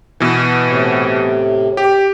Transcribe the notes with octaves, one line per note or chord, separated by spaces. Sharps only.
B2 E3
A2 C3
G4